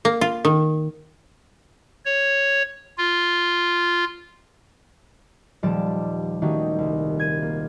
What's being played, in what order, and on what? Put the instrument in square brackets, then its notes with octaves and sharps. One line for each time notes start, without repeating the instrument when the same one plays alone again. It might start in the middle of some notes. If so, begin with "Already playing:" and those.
[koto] A#3
F4
D#3
[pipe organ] C#5
F4
[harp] D#1 F3 G3 D5 A5
D#3 G3 A3 C#4 D#4 F#4
C2
G#6 D#7
A#3